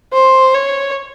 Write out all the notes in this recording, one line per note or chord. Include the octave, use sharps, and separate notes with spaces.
C5
C#5